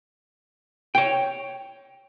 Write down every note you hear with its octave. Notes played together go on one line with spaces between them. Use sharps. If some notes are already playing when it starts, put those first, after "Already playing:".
C#5 G5